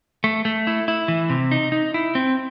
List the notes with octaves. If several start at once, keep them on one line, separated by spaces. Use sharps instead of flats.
A3
A3
E4
E4
E3
C3
D#4
D#4
E4
C4